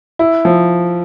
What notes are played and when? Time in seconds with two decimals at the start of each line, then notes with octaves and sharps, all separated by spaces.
0.19 E4
0.45 F3